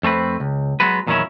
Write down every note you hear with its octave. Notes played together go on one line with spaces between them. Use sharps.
F2 A3 C4 B4
C#2
F#3 G#3 B3 F#4 B4
E2 A#2 D#3 F#3 C#4 E4